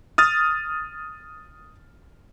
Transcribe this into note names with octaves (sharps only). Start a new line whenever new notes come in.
D#6 F6 A6